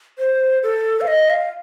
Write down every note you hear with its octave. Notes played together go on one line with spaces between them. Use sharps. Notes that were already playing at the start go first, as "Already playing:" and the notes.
C5
A4
F5
D#5
F5